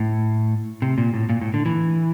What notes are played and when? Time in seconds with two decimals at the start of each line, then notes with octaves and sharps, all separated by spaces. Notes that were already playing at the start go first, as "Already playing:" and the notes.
Already playing: A2
0.82 C3
0.98 A#2
1.14 A2
1.29 A#2
1.42 A2
1.54 D3
1.66 E3